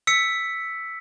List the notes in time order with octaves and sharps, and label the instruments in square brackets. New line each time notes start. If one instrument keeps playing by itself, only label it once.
[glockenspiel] E6 B6 C#7